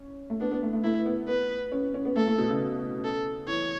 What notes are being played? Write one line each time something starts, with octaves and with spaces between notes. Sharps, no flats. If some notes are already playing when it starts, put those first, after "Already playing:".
Already playing: C#4
A3
B3 D4
B3
A3
A3
A3 E4
B3
B3 B4
C#4
C#4
B3
A3 A4
A3
B2
C#3
A4
E3 C#5